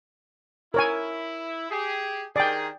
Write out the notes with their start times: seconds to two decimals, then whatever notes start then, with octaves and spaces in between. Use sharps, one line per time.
0.74 E4 A#4 C#5 G#5
1.71 G4 G#4
2.36 D#3 G#4 D5 G5